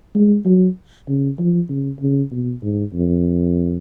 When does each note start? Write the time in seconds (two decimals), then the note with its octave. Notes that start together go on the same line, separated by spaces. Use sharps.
0.15 G#3
0.45 F#3
1.08 C#3
1.39 F3
1.69 C#3
2.00 C#3
2.31 B2
2.62 G#2
2.94 F2